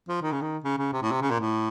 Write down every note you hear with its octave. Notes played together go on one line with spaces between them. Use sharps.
F3
D#3
C#3
D#3
C#3
C#3
C3
A2
C3
C#3
A#2
A2